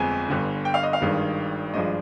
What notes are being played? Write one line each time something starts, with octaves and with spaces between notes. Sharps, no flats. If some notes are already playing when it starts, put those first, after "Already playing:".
Already playing: G1 F2 G#3 C4 G#5
G1 G2 D3
G5
F5
D#5
F5
G#1 G2 D#3 G#3
G#1 G2 F3 G#3 D4 D#5